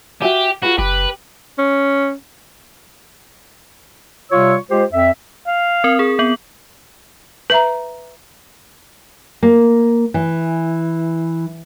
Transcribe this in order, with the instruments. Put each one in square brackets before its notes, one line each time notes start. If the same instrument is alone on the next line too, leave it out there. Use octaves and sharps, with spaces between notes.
[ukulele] F#4 E5 G#5 [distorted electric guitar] G4
[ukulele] F4 G#4 B4 [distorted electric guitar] F#4
[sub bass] F#1 [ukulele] G4 [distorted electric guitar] B4
[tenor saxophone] C#4
[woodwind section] C3 G3 F4 C#5 C#6 E6
G#3 F4 G4 C5
F2 E5
[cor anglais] F5
[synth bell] C4 A#4
G#4
B3 F#7
[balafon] B4 E5 A#5
[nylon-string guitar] A#3
E3